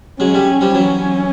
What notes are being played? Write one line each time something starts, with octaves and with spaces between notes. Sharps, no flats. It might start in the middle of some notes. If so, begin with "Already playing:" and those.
F#3 G#3 C#4
G3 A3
F3 G3
E3 F#3 C#4